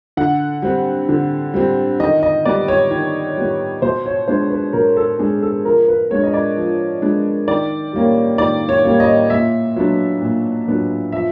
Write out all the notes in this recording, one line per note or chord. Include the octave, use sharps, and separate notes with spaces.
D3 F#5
G3 C4
D3
G3 C4
D#3 D#5
D#5
G3 B3 D5
C#5
D#3
G3 B3
B2 C5
C#5
G#3 B3 D4 C5
B4
B2 A#4
A4
G#3 B3 D4 G#4
A4
F3 A#4
B4
G#3 B3 D4 C#5
D#5
D5
F3
G#3 B3 D4
D#3 D5
G3 A#3 C#4
D#3 D5
C#5
G3 A#3 C#4
D#5
A#2 E5
F#3 B3 D4
A#2
F#3 B3 D4
F3 E5